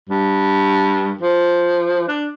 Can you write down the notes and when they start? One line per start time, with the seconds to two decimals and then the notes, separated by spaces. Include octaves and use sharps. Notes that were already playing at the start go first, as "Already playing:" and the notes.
0.09 G2
1.21 F3
2.08 D4